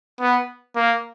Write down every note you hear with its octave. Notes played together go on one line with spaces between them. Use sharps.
B3
A#3